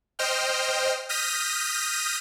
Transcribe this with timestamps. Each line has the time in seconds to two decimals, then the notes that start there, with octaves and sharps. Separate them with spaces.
0.19 C5 D#5 G5 F6
1.09 D#6 F6 G6 A#6 B6 D#7